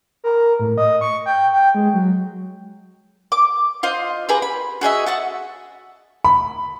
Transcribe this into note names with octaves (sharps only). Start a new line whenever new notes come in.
A#4
A2
D#5
C#6
G5
G5
G#3
F#3
D6
F4 C5 D#5
G4 G#4 B4 A#5
B5
F#4 G#4 D#5 E5
F#5 A5 C#6
B5